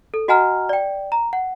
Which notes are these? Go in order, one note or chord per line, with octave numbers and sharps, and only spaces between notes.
A4
F#4 D#5 F#5 G#5 A#5 F6
D5 G5
A#5
F#5